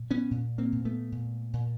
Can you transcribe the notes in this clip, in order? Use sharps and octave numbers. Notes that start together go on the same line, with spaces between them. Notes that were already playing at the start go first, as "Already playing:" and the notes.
Already playing: A#2
B3 C#4
A#2
A#3 C4
A#2
A3 B3
A#2
A#2